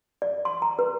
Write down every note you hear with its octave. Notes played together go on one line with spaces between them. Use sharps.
D5
C6
A#5
B4